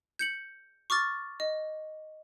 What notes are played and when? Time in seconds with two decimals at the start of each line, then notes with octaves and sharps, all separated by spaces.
0.19 G6 C#7 F#7
0.90 C#6 D6 F6 A6
1.40 D#5